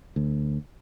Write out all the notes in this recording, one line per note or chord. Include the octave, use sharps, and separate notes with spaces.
D2